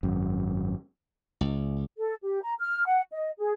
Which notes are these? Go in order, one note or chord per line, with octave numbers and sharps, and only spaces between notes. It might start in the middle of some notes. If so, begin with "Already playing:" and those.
G#1 F#2
C#2
A4
G4
A#5
F6
F#5
D#5
G#4